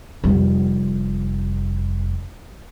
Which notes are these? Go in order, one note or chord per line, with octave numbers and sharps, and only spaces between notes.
F1 G3